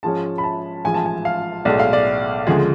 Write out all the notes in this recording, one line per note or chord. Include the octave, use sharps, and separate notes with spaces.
G#2 F3 G#3 C#4 A5
B5
A5
A1 G#2 F3 G#5
A5
G#5
F5
B1 A2 G#3 D5
F5
D5
D2 C#3 F3 G#3 G#4